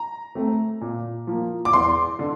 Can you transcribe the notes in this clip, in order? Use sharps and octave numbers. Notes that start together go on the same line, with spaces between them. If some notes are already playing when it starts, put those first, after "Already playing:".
Already playing: A#5
A3 C4
A#2
F3 A#3
D6
E2 C6
D3